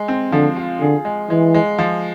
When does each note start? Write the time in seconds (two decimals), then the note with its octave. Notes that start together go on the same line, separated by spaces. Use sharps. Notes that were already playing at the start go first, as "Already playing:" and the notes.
Already playing: G#3
0.08 C4
0.32 D3 F3
0.56 F4
0.81 D3 G#4
1.05 G#3
1.30 E3 G#3
1.54 G#3
1.79 F3